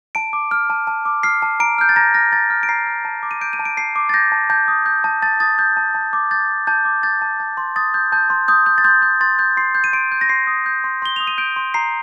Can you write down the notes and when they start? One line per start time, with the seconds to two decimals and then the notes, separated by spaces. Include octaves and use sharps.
0.15 A5 D7
0.33 D6
0.51 F6
0.70 A5
0.87 A5
1.05 D6
1.23 F6 C7
1.42 A5
1.60 A#5 D7
1.78 F6 G6
1.89 A6
1.96 A#5 A#6
2.14 F6 A#6
2.32 A#5 A6
2.50 F6
2.63 D7
2.69 A#5 C7
2.87 F6
3.05 A5
3.23 D6
3.31 D#7
3.41 G6 D7
3.53 D#7
3.59 A5
3.65 D7
3.77 A5 C7
3.96 D6
4.09 A6
4.14 G6 A#6
4.32 A5
4.50 A5 G6
4.68 D#6
4.86 G6
5.04 A5
5.22 A5 A6
5.40 D#6 A6
5.59 G6
5.77 A5
5.95 A5
6.13 D6
6.31 G6 A6
6.49 A5
6.67 A5 G6
6.85 D6
7.03 G6 A6
7.22 A5
7.40 A5
7.57 C6
7.76 D#6 A6
7.94 G6
8.12 A5 G6
8.30 C6
8.48 D#6 G6
8.66 G6
8.78 A6
8.84 C6 G6
9.02 G6
9.21 C6 A6
9.39 G6
9.57 C6 C7
9.75 G6
9.84 D#7
9.93 C6 D7
10.12 G6
10.21 A#6
10.29 C6 C7
10.47 D#6
10.66 G6
10.84 C6
11.02 C6 G7
11.16 D#6 F7
11.27 D#7
11.38 G6 D7
11.56 C6
11.74 A#5 C7